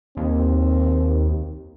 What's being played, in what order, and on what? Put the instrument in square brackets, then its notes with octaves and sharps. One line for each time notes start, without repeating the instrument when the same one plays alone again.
[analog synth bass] D#2 [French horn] C4